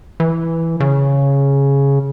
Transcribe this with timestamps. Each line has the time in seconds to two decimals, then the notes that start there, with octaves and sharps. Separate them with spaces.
0.20 E3
0.80 C#3